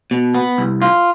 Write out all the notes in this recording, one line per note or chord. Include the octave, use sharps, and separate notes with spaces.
B2
B3
C2
F4